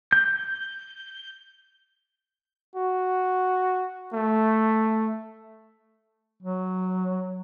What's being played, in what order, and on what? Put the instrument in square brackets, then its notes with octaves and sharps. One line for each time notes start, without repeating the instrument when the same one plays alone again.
[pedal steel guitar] G6
[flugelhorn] F#4
A3
[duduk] F#3